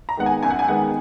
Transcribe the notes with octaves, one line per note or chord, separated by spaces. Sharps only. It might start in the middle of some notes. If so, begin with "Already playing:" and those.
A#5
D#3 G#3 B3 F#5
G#5
F#2 G#5
F#5
G#5
D#3 G#3 B3 F#5